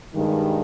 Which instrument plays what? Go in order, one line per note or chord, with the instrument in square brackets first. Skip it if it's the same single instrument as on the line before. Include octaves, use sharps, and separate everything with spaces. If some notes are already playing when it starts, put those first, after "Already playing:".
[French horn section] G2 D#3 G#3